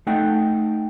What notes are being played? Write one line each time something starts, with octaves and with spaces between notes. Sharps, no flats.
A3 D#4 F#5 G5